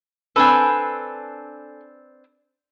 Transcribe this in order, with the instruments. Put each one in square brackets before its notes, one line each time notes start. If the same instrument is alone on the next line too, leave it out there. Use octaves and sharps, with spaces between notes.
[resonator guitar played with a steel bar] C4 D4 B4 [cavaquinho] A4 G#5